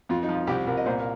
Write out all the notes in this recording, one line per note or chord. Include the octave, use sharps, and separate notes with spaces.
F2 F4
D#4
F3
F4
C2 G4
C2 A#4
D#5
A#2 C5
A#4